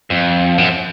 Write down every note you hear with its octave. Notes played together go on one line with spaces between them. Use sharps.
F2
F#2